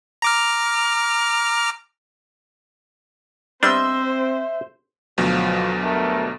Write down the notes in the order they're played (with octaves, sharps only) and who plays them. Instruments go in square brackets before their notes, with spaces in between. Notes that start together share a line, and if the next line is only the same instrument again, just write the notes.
[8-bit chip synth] A#5 D6 F6
[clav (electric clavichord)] G3 B3 D4 [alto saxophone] C4 [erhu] C5 [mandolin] D#5 E5 C6
[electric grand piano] D2 B2 F#3 [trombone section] F3
[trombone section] G2 A3 A#4